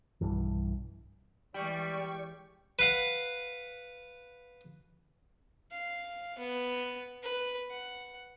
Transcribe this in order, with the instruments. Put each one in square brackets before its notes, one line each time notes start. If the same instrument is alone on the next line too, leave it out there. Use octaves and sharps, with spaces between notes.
[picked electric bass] B1 G2 E3
[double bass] E3 G#3 [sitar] G3 [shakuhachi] D5 [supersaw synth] G5 C#6
[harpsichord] B4 F5 F#5
[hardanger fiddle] F5
B3
B4
F#5